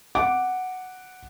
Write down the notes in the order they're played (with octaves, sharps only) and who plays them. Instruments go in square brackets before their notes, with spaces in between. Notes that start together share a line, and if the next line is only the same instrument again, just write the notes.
[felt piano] F#5 D6